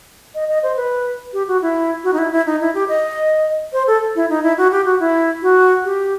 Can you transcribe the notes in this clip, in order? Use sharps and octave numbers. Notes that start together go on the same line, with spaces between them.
D#5
D#5
C5
B4
G4
F#4
E4
F#4
D#4
E4
E4
D#4
E4
G4
D#5
C5
A4
E4
D#4
E4
F#4
G4
F#4
E4
F#4
G4